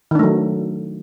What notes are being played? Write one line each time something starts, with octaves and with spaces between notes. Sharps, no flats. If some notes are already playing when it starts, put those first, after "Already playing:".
D#3 F#3 A3 D4